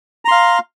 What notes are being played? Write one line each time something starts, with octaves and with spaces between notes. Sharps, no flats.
F5 A#5 C6